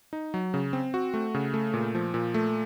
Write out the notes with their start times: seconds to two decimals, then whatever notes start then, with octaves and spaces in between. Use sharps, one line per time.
0.13 D#4
0.34 F#3
0.54 C#3
0.73 C4
0.94 F#4
1.14 A3
1.34 C#3
1.54 A3
1.74 A#2
1.95 F3
2.14 A#2
2.34 A3